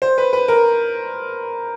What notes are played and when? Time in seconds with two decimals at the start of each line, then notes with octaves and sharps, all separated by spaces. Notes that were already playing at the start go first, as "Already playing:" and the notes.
0.02 C5
0.18 B4
0.33 B4
0.48 A#4